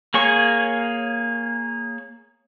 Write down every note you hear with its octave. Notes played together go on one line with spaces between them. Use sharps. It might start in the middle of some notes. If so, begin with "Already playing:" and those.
A#3 G#4 C#5 C#6